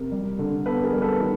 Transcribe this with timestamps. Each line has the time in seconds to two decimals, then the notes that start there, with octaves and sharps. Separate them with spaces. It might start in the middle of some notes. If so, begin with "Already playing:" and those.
Already playing: C3 A#4
0.12 G3
0.39 D3
0.65 B3 A4 B4
0.84 G#4 A#4
0.93 G3
1.02 A4 B4
1.20 D#3